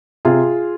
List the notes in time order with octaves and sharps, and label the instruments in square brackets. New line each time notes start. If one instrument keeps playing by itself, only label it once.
[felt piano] C3 F4 G#4